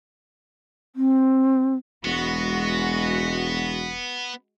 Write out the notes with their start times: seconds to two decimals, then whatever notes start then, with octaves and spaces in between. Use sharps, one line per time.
0.96 C4
2.05 E1 G#3 B3 F#4